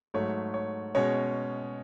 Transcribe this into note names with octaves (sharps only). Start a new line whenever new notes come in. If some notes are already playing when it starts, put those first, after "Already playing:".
G#2 F#3 A3 C#5
C#5
B2 G#3 C#4 C#5